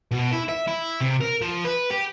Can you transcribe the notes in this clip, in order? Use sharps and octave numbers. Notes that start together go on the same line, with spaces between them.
B2
E4
E5
E4
C3
A#4
F3
B4
G4